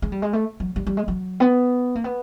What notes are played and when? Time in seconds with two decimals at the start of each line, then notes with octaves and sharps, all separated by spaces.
0.02 G#3
0.12 G3
0.22 G#3
0.33 A3
0.60 F#3
0.76 G3
0.87 G3
0.97 G#3
1.08 F#3
1.40 B3
1.96 A#3
2.04 B3